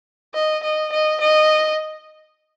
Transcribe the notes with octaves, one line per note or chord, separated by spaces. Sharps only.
D#5
D#5
D#5
D#5